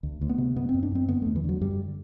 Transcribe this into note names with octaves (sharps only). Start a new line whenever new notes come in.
D2
D2
B3
C3
F#2 B3
C4
F#2
D4
F#2 C4
D3 B3
E2 A3
E3
D3 F#3
F#2 G3